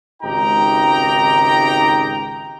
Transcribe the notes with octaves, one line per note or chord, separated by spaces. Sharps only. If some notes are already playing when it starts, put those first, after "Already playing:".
G#1 C#2 D#4 G4 G5 A#5